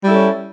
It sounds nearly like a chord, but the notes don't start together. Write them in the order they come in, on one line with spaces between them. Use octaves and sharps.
G3 E4 A4 C#4